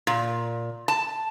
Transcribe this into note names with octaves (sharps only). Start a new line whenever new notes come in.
A#2
A5